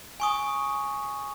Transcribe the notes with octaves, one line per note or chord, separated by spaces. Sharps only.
G#5 C#6 D#6